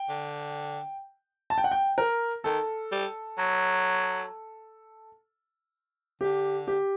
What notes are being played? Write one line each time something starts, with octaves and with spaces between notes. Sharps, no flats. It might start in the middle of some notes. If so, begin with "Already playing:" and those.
Already playing: G5
D3
A5
G5
F#5
G5
A#4
D#3 A4
G3
F#3
D3 G4
G4